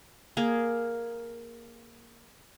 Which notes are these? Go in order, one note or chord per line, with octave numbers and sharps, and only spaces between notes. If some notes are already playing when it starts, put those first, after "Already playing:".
A#3 G#4 A#4